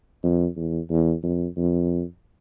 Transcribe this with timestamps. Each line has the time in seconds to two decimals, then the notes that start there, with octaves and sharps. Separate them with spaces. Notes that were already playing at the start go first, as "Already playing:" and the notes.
0.23 F2
0.56 E2
0.90 E2
1.23 F2
1.57 F2